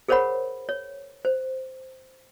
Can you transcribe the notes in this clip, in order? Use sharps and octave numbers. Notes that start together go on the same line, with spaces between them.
G#4 A#4 C5 C#5 F#5 B5
C#5
C5